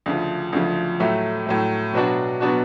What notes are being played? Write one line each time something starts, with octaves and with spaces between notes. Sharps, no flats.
D2 C#3 F3
D2 C#3 F3
A2 F#3 A3
A2 F#3 A3
B2 F#3 B3 D4 F#4
B2 F#3 B3 D4 F#4